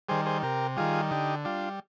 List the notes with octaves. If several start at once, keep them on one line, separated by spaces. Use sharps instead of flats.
D#3 G3 G#4 C5
G#4 C5
C3 G4 A#4
D#3 G3 F4 G#4
D3 D#4 G4
G3 D4 F4